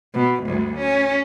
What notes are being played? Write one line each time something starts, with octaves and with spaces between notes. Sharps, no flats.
B2
D2 G2
C#4